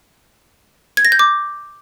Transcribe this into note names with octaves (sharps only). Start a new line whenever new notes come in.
G#6
A#6
G6
D6